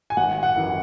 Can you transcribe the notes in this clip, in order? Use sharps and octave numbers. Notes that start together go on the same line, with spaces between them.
G#5
G#1 F#5
F#5
F#2 E3